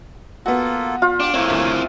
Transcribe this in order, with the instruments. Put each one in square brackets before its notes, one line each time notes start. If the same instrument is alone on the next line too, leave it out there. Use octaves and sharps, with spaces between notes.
[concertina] A#3 F4 A4 [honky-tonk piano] B3 F#4
[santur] F4
[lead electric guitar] D4 [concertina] G4
[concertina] A3 A#3 C#5 [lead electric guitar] C4 E4
[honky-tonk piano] D2